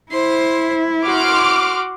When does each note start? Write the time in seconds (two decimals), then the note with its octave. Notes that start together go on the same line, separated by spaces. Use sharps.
0.11 E4 C5 C6
1.06 F#4 C6 D6 F6